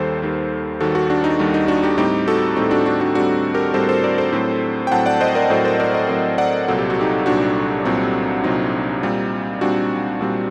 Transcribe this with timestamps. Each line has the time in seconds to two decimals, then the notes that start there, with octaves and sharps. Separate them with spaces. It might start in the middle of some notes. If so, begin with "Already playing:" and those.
Already playing: D#2 D#3 G3 A4 C5
0.22 D#2 D#3 G3
0.80 D#2 D#3 G3 F#4 A4
0.95 F#4 A4
1.10 D4 F#4
1.24 D#4
1.39 D#2 D#3 G3
1.54 D#4
1.68 D4 F#4
1.83 D#4 G4
1.98 A2 G3 C4 D#4 G4
2.28 F#4 A4
2.56 A2 G3 C4 D#4 G4
2.71 D4 F#4
2.86 D4 F#4
3.01 D4 F#4
3.15 A2 G3 C4 D4 F#4
3.54 G4 A#4
3.74 A2 G3 C4 A4 C5
3.89 A4 C5
4.04 A#4 D5
4.18 A4 C5
4.33 A2 F#3 C4
4.87 G5
4.92 A2 F#3 C4 F#5 A5
5.06 D5 F#5
5.21 C5 D#5
5.35 A#4 D5
5.50 A2 F#3 C4 A4 C5
5.64 A4 C5
5.80 A#4 D5
5.94 C5 D#5
6.09 A2 F#3 C4 A4 C5
6.38 D5 F#5
6.68 C2 A#2 F#3 C4 A4
6.78 G4
6.90 F#4
7.01 D#4 G4
7.26 C2 A#2 F#3 C4 D4 F#4
7.85 C2 A#2 F#3 C4
8.44 C2 A#2 F#3 C4 D#4
9.03 A#2 G3 C4
9.61 A#2 G3 C4 D4 F#4
10.21 A#2 G3 C4